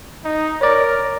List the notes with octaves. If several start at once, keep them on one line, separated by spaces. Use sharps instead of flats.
D#4
A#4 C#5 D5